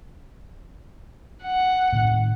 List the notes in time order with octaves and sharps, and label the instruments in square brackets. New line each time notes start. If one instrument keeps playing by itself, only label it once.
[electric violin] F#5
[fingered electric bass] A2 C3 D#3